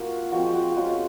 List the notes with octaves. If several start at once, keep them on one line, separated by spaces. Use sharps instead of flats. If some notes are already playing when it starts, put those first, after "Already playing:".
Already playing: A#3 C4 F4 F#4 G#4
F3 G#3 C4 F#4
F#4
G#3 C#4 F4 F#4